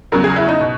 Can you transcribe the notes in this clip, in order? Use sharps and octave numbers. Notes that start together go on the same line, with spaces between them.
E2 C#3 F#3 A#4
G#4
E4
D#4
B2